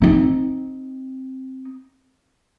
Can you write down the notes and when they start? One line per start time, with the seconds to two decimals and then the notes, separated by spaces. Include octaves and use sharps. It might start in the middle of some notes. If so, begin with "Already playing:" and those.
0.02 C4 D#4